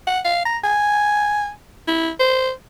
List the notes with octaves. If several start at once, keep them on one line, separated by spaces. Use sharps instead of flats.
F#5
F5
A#5
G#5
E4
C5